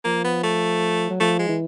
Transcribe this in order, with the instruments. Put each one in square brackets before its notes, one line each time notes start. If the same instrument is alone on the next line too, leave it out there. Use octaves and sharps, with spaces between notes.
[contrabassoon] F3 [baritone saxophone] A#3
[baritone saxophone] B3
A3
[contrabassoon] F#3
[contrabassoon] F3 [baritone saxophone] A3
[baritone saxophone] G#3
[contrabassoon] E3